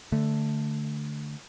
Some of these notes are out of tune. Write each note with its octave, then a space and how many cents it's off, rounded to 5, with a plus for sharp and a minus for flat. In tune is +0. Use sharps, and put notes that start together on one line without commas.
D3 +0 A3 +0